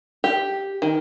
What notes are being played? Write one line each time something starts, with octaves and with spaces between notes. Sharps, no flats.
G4
D#3